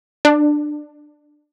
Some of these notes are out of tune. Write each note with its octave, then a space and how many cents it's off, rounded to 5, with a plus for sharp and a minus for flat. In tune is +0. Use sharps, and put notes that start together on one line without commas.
D4 +15